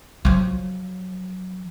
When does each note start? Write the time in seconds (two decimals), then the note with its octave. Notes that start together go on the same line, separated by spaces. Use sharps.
0.25 F3 F#3